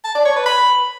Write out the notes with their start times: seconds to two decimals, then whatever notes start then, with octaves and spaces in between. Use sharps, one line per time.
0.04 A5
0.15 D5
0.25 C#5
0.36 B4
0.46 B5